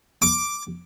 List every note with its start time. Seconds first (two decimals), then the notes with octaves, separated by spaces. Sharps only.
0.22 D6